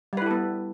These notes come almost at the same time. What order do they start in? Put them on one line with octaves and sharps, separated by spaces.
G3 B4 E4 A4 B3